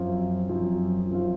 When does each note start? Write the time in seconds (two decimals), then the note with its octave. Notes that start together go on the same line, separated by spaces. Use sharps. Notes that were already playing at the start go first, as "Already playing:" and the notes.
Already playing: F#2 F3 C4 F4
0.49 F#2 F3 C4 F4
1.10 F#2 F3 C4 F4